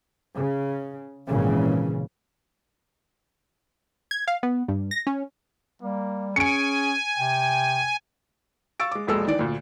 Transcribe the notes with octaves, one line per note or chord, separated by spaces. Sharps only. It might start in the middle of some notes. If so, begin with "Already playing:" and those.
C#3
G#1 A#2 C#3 E3
G#6
F5
B3
G2
A#6
C#4
G3 A#3
C#4 G#4 G#5 C#7 D7
C3 G5
F5 C#6 E6 A6 D7
G#3 D6
E1 A#1 G#3 A4 E6
D#3 E3 D5
D2 A#2